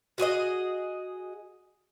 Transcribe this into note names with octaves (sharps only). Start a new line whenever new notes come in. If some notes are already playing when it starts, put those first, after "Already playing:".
F#4 G#4 C#5 D#5